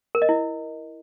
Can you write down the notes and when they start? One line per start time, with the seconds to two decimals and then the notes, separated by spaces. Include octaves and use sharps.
0.15 A#4
0.22 D#5
0.29 E4